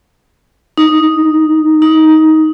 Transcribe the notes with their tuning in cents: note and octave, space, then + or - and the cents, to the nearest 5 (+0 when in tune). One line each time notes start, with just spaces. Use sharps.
D#4 +0
D#4 +15